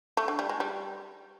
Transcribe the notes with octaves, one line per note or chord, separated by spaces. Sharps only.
A3
D3
G3
G#3
G3